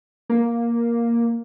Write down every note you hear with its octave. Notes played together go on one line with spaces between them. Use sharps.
A#3